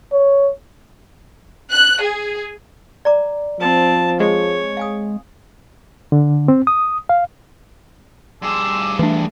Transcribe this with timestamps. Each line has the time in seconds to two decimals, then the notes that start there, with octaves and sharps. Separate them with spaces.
0.12 C#5
1.71 F#6
2.02 G#4
3.05 D5 A#5 D6
3.60 F3 C4 A5
4.20 G#3 C#5
4.77 F5 G#5 D#6
6.12 D3
6.48 C4
6.67 D#6
7.09 F5
8.42 G2 G#4 A5 C6 D6 E6
8.99 E3 A3 D4